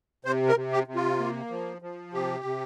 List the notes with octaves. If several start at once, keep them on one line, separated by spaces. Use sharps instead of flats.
C3 C5
A#4
C3
G4
C3
F4
A#3
F3
F3
C3 G4
C3